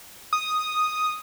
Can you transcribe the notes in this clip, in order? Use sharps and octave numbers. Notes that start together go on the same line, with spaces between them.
D#6